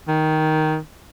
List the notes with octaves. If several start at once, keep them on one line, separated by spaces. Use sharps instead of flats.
D#3